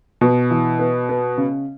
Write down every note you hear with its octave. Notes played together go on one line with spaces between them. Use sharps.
B2 B3
E3
B3
B3
C#3